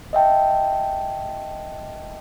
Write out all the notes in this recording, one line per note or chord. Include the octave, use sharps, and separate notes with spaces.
D#5 E5 G5 A5